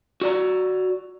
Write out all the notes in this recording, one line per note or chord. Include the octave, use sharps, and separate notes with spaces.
F#4 D5 A#5